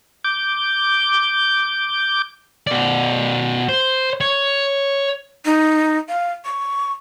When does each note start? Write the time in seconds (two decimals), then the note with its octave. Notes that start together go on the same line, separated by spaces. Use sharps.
0.24 D6 G6
2.67 B2 D5
3.69 C5
4.21 C#5
5.45 D#4
6.09 F5
6.45 C#6